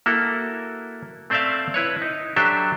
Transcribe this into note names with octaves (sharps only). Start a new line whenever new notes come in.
A#3 E4 F#4 A4
A3 C4 C5 D5 E5 F5
E4 B4 C#5
D#4
F#3 D4 G4 A4 C5 E5